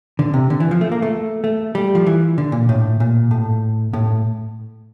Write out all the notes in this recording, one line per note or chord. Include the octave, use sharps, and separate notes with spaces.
D3
C3
D3
E3
F3
A3
A#3
A3
A3
G3
F3
E3
D3
A#2
A2
A#2
A2
A2